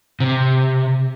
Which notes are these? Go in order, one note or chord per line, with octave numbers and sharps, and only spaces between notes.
C3